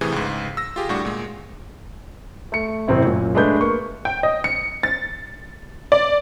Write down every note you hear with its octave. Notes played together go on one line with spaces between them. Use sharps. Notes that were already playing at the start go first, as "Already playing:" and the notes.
A2 C3 E3 G#4
C#2 G#2
E6 A#6
F4 G4 G#4
A2 G3 D4 F#4 C#6
A#2 G#3
A3 C#7
F#1 A2 C3 C4 E4
F#2 A#2
G#3 A3 D4 B4 G6
A#3 C#6
G5
D#5
C#7
A6
D5